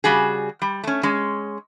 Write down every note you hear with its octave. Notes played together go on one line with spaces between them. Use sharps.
C#3 G3 F#4 G#4
G3
A3 C#4
G#3 C#4